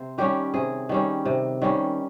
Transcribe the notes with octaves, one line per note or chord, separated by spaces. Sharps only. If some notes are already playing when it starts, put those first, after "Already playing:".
Already playing: C3 C5
D#3 G3 C#4 G4
C3 G#4
D#3 G3 C#4
C3
D#3 G3 C#4